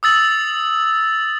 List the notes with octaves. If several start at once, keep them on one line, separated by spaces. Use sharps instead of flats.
D#6 E6 A6 F#7